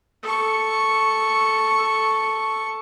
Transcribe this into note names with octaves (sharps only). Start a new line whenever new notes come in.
A4 C#6